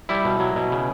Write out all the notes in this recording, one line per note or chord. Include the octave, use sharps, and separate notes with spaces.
G3 E4
B2
F#3
B2
C#3